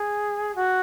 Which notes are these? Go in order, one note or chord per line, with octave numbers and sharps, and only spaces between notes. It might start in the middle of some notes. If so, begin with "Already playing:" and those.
Already playing: G#4
F#4